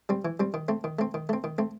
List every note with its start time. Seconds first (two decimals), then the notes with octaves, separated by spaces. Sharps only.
0.09 G3 C4
0.25 E3
0.40 G3 C4
0.54 D#3
0.68 A3 C4
0.84 D#3
0.99 A3 C4
1.14 D#3
1.29 A3 C4
1.44 D#3
1.58 A3 C4